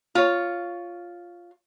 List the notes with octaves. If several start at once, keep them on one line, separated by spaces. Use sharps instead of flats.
F4 C#5